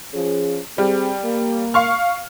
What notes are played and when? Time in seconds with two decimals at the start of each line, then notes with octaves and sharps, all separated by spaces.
0.14 F3 C#4 G#4
0.78 G3 C4 G#4
1.24 A#3
1.74 F5 C#6 F6